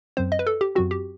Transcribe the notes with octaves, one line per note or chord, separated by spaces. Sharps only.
F#2 F#3 C4 C5
D#5
B4
A4
G4
F#2 F#3 C4 F#4
G4